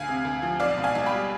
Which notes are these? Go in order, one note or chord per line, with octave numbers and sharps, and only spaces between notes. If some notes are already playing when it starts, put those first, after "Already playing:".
Already playing: D2 F5 G#5
C3
D2
F3
B1 D5 F5
B2
F5 G#5
B1
G5 B5
G3